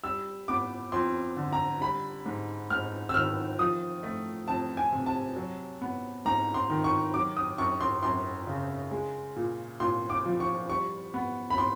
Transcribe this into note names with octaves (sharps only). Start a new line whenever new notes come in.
G3 E6
B3 D6
F2 C6
D3
A#5
G3 B5
G#2
G#2 F6
E6
D#3 F6
F3 D#6
A3
F2 A5
G#5
C3
A5
F#3
B3
G#2 A#5
C6
D#3
C#6
F#3 D6
D#6
F#2 C#6
C6
F#2 C6
C#3
G#3
A#2
A#2 C6
D6
F3
C#6
G3 C#6
B3
B5
C6